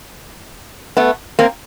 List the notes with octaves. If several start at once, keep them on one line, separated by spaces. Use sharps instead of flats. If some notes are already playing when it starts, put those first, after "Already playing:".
A3 B3
A#3 C4